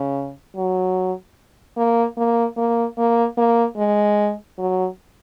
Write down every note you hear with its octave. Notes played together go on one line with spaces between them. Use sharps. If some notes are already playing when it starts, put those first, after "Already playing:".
Already playing: C#3
F#3
A#3
A#3
A#3
A#3
A#3
G#3
F#3